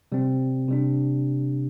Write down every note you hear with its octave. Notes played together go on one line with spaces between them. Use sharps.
C3 G3 C4
C3 G3 D4